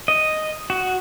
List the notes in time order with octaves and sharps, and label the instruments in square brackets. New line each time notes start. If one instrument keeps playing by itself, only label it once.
[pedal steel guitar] D#5
F#4